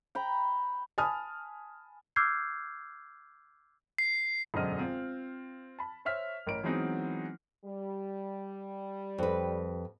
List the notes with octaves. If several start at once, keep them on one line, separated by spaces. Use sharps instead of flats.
G5 A#5 B5
G#5 A5 B5 D#6 F6
D6 E6 F6 G6 G#6 C7
C7
E1 F#2 D3 C5 D#5 F6
C4 F4
A5 B5
C5 C#5 E5 F6 B6
A1 A#4 C#5 D7
E3 F#3 G#3 B3 C4 D#4
G3
F2 B4